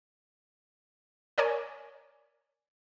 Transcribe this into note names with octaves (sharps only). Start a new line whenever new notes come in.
A#4 C#5 D5 G#5